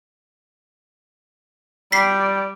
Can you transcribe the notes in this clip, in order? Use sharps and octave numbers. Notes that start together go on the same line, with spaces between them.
G3 D5 G5 B6 C7